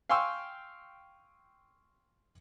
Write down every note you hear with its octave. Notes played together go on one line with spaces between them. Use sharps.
F5 G5 G#5 C6 C#6 E6